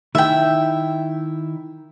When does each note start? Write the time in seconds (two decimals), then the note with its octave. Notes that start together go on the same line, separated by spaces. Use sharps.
0.15 D#3 D#4 E4 E5 G5